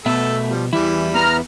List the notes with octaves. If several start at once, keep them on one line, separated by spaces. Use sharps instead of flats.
B2 A3 B3 A4 E5
F3 G3
E2 E3 G3 E4
B3 A#5 F6